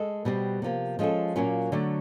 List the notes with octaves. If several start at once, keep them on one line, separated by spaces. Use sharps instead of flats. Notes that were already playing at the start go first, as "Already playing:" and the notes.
Already playing: G#3 A4
B2 G3 C4
C3 F3 A#3
F3 G#3 C#4 F4 A4
A#2 F#3 A#3 C#4 F4
D3 F#3 A3